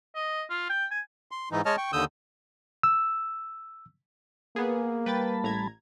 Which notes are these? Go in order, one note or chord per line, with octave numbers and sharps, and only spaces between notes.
D#5
F4
G5
G#5
C6
G#2 E3 D#4
G#3 C#5 D#5 A5 F6
G5 C#6
D#2 D3 D#6 E6 G6
E6
A#3 B3 G#4
G3 B4 G5 A5 B5 A6
A1 A#5 G#6